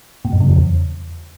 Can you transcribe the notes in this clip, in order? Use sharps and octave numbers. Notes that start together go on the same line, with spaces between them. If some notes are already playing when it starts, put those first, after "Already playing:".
A#2
F#2
C#3
F2
E2